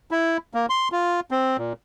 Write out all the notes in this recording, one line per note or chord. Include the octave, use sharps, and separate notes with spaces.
E4
A#3
C6
F4
C4
A#2